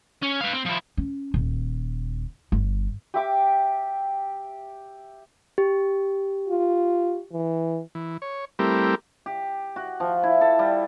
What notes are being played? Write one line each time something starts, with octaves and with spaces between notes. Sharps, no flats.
C#4
B4 F5
C4
F3 E4
C#4
D#1
G1
G4 E5 D6
G4
F4
E3
E3
C#5
G3 A3 C4 E4 G4 A#4
G4
F#4
F3
E4
A4
G3